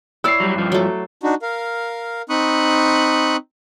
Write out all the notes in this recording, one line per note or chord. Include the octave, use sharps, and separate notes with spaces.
E4 C#5 D5 E6 C7
F#3 G3
G2 F3
F#3 A3
D4 D#4 F#4
A#4 F5
C4 D#4 B5 C#6 D#6 F#6